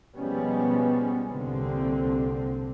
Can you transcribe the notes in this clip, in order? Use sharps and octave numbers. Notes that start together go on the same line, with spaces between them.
B2 F3 G3 G#3 B3 C#4
C2 A#2 D3 G3 C4